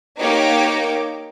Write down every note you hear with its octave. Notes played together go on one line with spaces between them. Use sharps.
A#3 D#4 G4 C#5 D6